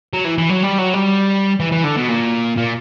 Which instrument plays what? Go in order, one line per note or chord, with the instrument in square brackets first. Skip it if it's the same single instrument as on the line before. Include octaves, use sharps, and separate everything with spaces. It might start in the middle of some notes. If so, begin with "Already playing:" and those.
[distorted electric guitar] F#3
E3
E3
F#3
G3
F#3
G3
E3
E3
D3
B2
A#2
A#2